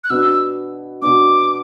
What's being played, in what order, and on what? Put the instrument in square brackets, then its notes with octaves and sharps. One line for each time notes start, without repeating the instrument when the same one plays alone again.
[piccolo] F#6
[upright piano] B2 B3 D4 [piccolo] E6
[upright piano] B2 B3 D4 [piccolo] D6